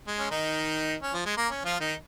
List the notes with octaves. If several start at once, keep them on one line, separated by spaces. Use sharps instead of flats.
G#3
C#4
D#3 D#4
C#4
F3
G#3
A#3
C#4
F3 F4
D#3 D#4